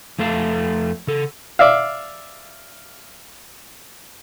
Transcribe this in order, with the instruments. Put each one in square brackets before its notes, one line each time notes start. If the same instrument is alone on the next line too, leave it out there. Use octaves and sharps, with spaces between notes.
[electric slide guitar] F2 A3 A4 F5
C#3 A4
[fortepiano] D5 E5 F5